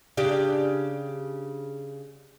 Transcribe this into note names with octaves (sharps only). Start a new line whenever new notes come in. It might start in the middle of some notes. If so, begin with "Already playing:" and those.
C#3 D4 G4